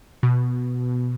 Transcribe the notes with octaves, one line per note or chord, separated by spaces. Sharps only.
B2